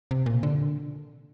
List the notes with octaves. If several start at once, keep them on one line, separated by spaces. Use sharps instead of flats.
C3
A#2
D3